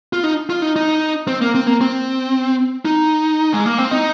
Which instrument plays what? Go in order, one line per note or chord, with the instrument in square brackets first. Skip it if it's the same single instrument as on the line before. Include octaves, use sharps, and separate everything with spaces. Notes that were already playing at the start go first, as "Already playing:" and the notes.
[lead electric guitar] F4
D#4
F4
D#4
D#4
C4
A#3
C4
A#3
C4
D#4
G#3
A#3
C4
D#4